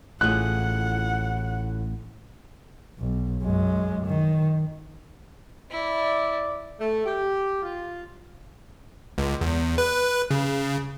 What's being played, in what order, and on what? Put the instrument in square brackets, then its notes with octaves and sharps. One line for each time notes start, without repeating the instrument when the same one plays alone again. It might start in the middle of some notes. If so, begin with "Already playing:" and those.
[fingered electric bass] A1 [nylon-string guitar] A2 F4 G#4 [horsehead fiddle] F#5 [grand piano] F#6
[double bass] B1
F#2 G#3
D#3
[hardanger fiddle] E4 [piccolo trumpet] D5
[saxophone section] A3
G4
F4
[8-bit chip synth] C#2
E2
B4
C#3